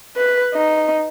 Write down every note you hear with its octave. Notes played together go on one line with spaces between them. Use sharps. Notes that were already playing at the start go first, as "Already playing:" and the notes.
B4
D#4